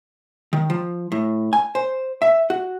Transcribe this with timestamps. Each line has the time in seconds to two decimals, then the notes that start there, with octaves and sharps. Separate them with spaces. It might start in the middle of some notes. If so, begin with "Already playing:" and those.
0.53 D#3
0.70 F3
1.12 A2
1.53 G#5
1.75 C5
2.22 E5
2.50 F#4